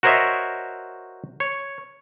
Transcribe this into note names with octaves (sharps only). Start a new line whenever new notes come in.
F#4 A#4 C5 C#5 D#5 E5
C#5